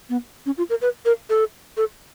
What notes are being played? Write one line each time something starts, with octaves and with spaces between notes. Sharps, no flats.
B3
C#4
F4
A#4
B4
A#4
A4
A4